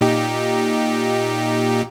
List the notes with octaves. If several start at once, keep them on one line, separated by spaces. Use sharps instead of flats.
A#2 D#4 G4